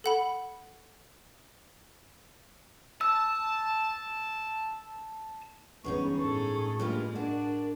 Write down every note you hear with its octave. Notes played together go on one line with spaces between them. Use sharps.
A4 F#5 B5
A5 E6
G1 E2 G#3 B3 C#4 D#4 C#6
A2 G#4 A4
G2 G3 G#3 A#3 F4
D4 F#4 A#4